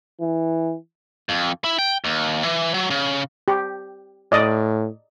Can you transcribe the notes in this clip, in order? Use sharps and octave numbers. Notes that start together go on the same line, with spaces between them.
E3
F2
E4
G5
D#2
E3
F#3
C#3
G4
A2 D5 D#5